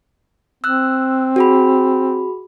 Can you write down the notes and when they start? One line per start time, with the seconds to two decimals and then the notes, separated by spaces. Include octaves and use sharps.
0.64 C4 E6 F#6
1.36 F#4 G#4 B5